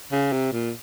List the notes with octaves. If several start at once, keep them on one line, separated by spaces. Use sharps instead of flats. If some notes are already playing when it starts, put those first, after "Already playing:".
C#3
C3
A#2